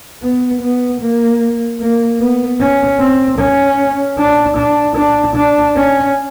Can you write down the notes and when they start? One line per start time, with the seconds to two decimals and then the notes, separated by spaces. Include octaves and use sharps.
0.23 B3
0.62 B3
1.01 A#3
1.80 A#3
2.20 B3
2.60 C#4
3.00 C4
3.38 C#4
4.18 D4
4.57 D4
4.97 D4
5.36 D4
5.76 C#4